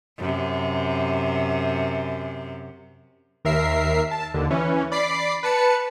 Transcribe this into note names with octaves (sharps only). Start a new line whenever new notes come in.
F#2 C3
D#2 A#4 E5 C7
A5
D#2 D3
E3 C#4
D5 B5 D6 C7
B4 A5 C#7